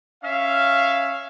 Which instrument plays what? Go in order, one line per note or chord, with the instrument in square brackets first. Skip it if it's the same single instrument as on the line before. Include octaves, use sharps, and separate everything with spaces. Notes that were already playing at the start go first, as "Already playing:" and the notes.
[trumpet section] C#4 E5 F5